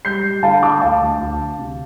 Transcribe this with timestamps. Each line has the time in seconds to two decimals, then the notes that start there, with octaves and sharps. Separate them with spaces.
0.05 G3 G6 C7
0.24 G3
0.43 D3 F5 A5
0.62 D3 A5 D6
0.81 D2 F5 A5
1.01 D2
1.20 D2
1.39 D3
1.58 C3